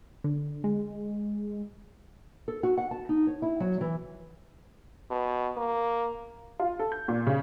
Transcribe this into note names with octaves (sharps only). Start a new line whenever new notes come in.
D3
G#3
A4
F#4
F#5
A5
D#4
C#5
E4
F#3
E3
B2
A#3
F4
A4
G6
A#2
C#3